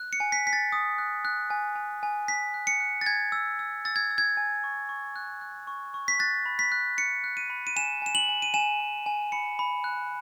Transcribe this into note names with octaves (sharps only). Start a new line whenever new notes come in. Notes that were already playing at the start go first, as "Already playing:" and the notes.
Already playing: F#6
C#7
G#5
B6
G#5 B6
A6
D#6
F#6
F#6
G#5
G#5
G#5
G#5 B6
F#6
C#7
F#6
A6
G#5 G#6
E6
E6
E6 A6
G#6
E6
G#6
G#5
C#6
C#6
F#6
F#6
C#6
C#6
B6
F#6 A6
B5
B6
F#6
F#6 C#7
F#6
D#7
B5
D#7
G#5 E7
G#5 E7
F#7
G#5
D#7
G#5 E7
G#5
G#5
B5 C#7
B5
F#6